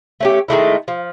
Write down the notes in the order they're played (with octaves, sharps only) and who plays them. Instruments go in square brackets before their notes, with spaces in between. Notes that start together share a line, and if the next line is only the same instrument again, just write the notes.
[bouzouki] A3 C#4 G4
D#3 G#3 A3 E4
F3